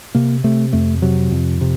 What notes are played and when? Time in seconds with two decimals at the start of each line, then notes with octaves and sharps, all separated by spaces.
0.15 C3 A#3
0.44 C3 A3
0.73 F2 A3
1.02 C3 F#3
1.32 F2
1.61 C3